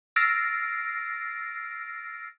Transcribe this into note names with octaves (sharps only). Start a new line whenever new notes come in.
E6 F6 A6 A#6 C7 D7